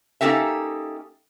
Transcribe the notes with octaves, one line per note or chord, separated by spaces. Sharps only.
A#3 C#4 D#4 G4 A4 E5